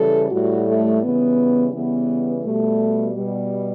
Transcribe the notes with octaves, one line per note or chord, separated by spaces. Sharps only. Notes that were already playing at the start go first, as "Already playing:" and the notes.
Already playing: C#3 E3 G3 A4
A2 G3 F#4
A3
C#3 E3 G3 B3
C#3 E3 G3 B3
B2 G3 A3
B2 G3